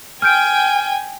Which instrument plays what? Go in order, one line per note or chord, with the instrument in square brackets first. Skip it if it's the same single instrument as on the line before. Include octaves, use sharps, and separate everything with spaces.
[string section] G5 [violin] G#5 [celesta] F6 G6 D7